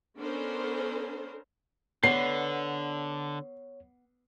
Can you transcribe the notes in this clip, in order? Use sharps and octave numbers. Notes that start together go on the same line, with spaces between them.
B3 C#4 D4 A4 A#4 C5
D3 B3 C#5 C7